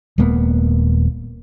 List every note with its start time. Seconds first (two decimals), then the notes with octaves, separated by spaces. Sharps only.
0.18 D#1 G#3 A#3 B3